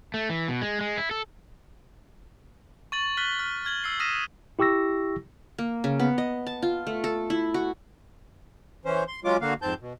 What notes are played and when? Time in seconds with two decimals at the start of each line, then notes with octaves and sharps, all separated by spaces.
0.14 A3
0.30 E3
0.48 B2
0.61 G#3
0.81 G#3
0.98 E4
1.11 A4
2.92 C#6 A6 F#7
3.17 C#6 F6 F#6 A6 B6 G7
3.39 F6
3.65 F6 G#6 F#7 G7
3.84 E6 C7
3.99 D#6 F6 A#6 B6 D#7 E7
4.59 E4 G4 C#6 E6 A#6
5.58 A#3
5.84 C#3
6.00 B3
6.18 D#5
6.47 A5
6.62 F4
6.87 A3
7.04 A4
7.30 E4
7.54 F#4
8.85 E3 C#4 C5
9.08 C6
9.24 F#3 G#3 C#4 F4 D6
9.41 D3 A#3 F#4 F5
9.62 F2 G#2 C4 A5 G6
9.81 B2